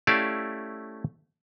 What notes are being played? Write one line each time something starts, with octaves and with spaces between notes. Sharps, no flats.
A3 C#4 E4 G4 D5 F5